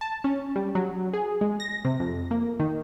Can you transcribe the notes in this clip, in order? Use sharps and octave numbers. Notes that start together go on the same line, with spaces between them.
A5
C#4
G3
F#3
G#4
G#3
A#6
C3
F2
A#3
D#3